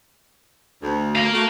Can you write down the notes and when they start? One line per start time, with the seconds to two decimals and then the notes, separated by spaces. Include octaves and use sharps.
0.82 D2
1.16 A#4 F5
1.33 A3 F#4